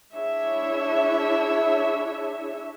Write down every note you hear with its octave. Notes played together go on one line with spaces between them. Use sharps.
D4 E4 G#4 C#5 E5